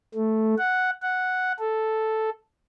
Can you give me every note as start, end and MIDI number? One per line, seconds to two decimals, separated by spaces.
0.15 0.55 57
0.58 0.90 78
1.02 1.52 78
1.59 2.30 69